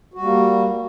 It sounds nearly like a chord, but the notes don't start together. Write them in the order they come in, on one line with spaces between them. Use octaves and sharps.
F#4 G3 A#3